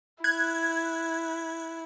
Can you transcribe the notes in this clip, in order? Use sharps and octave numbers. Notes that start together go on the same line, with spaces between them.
E4 F#6 G#6